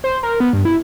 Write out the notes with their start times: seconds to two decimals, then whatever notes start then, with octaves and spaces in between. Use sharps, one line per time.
0.04 C5
0.23 A#4
0.40 B3
0.53 G2
0.65 E4